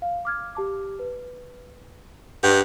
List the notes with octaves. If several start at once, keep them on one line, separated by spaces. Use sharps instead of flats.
F5
D6 F6 G#6
G4 A5 D6
B4
G2 F#5